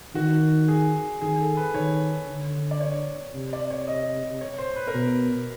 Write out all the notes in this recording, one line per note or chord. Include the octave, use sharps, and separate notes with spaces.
D#3 F#4
G#4
D#3 G#4
A4
B4
D#3 C#5
D3
D5
C#5
C3
D5
C#5
D#5
C#5
C5
B4
A#4
B2 B4